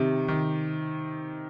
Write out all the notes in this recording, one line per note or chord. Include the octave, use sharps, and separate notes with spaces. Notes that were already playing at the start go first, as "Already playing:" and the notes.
Already playing: C3 D#3
D#3